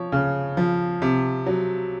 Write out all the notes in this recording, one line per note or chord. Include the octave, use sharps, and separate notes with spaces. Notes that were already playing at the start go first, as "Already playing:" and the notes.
Already playing: F3 C#5
C#3
F3
C3
F#3